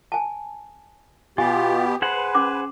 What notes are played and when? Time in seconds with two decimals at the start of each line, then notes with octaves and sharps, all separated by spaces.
0.12 G#5 A5
1.38 B2 B3 F4 G4 G#5 C6
2.02 G#4 B4 C5 F#5
2.35 C#4 D6